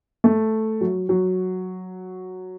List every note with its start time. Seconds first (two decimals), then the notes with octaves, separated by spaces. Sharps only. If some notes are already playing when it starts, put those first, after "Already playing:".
0.24 A3
0.81 F#3
1.09 F#3